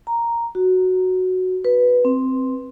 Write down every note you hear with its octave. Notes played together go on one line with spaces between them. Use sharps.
A#5
F#4
B4
C4